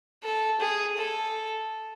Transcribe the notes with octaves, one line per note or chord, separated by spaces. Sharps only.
A4
G#4
A4